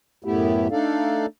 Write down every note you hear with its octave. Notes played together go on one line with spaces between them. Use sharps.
F#2 A2 A3 B3 E4 G4
A3 D4 D#4 A4 D5 F5